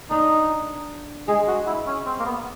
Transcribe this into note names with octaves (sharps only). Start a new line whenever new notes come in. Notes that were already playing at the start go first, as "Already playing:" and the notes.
D4 D#4
G#3 G#4
F#4
E4
C#4
C4
A#3
B3